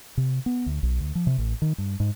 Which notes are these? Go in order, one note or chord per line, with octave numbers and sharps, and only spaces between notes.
C3
B3
D2
B1
D2
F3
C3
A1
D#3
G2
G#2